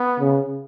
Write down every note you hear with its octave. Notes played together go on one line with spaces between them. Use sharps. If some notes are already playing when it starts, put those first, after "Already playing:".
Already playing: B3
C#3